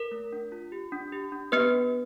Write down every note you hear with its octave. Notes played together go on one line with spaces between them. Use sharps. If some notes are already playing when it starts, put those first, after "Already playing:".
Already playing: A#4
A3
D4
F4
G4
D4
G4
D4
B3 G4 B4
D4